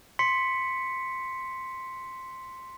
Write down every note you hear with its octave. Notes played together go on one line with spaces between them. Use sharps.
C6 B6 C#7